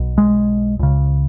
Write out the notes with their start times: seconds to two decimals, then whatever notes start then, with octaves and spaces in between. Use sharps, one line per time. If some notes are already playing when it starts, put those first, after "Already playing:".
Already playing: B1 B2
0.18 G#3
0.79 C#2 C#3